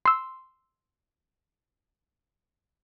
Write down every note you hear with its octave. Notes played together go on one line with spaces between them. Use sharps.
C6 E6